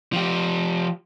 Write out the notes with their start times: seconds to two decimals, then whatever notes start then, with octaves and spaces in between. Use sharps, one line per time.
0.13 F3 G4